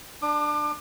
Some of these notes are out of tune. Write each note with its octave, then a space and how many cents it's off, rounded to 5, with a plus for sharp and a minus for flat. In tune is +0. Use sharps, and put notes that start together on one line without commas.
D4 +15 D6 +35